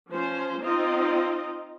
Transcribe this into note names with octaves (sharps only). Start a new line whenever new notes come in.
F3 C#4 C5
C4 D#4 F4 D#5